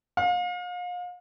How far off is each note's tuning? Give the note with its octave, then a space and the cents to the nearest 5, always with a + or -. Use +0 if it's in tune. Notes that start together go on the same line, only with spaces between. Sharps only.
F5 +35